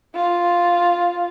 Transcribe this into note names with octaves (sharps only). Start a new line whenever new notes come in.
F4